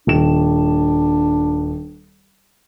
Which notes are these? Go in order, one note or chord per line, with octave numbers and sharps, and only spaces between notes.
D#1 D4 E7